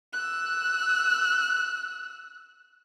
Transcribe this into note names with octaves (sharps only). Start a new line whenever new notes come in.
E6 F#6